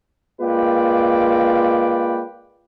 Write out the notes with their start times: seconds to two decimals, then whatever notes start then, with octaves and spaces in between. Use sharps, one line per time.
0.42 G#3 A#3 F4 B4 D5 G5